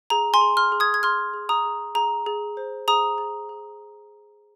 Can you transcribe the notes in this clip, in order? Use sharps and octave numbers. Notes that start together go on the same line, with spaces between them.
G#4 A#5
G#5 C6
G#4
C6 F6
G#4
D#6 G#6
G#6
G#4 C6 F6
G#4
A#5 D#6
G#4
G#4 A#5
G#4
C5
G#4 A#5 D#6
G#4
G#4